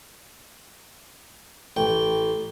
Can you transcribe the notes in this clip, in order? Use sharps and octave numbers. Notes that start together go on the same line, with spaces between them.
A1 G5